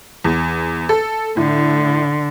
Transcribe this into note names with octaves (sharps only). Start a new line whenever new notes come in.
E2
A4
A2 D3